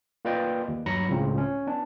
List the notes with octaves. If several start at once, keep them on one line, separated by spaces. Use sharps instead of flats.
A#3 F4 B4 D5 D#5 G5
D#2
G2 F#3 A#5 B5 A#6 C#7
C#2 A2 C#3 C4 F4
C#4
B3 D4